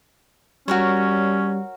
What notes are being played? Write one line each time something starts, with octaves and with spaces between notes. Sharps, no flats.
G3 C#4 F#4 A#4 C#5